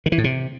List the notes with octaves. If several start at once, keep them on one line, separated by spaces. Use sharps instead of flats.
D#3
E3
A2
C3